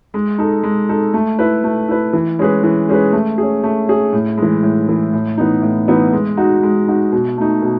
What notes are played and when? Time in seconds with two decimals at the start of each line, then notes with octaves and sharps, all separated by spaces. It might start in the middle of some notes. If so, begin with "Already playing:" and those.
0.14 G#3
0.38 D#4 A4
0.63 G#3
0.89 D#4 A4
1.14 A3
1.39 E4 B4
1.64 A3
1.88 E4 B4
2.13 E3
2.39 G#3 C#4 G#4 B4
2.63 E3
2.89 G#3 C#4 G#4 B4
3.13 A3
3.38 C#4 G#4
3.63 A3
3.88 C#4 G#4
4.13 A2
4.37 E3 G#3
4.63 A2
4.88 E3 G#3
5.13 A2
5.38 E3 B3 D#4
5.62 A2
5.88 E3 B3 D#4
6.13 G#3
6.37 D#4 F#4
6.63 G#3
6.88 D#4 F#4
7.12 B2
7.38 A3 D#4
7.62 B2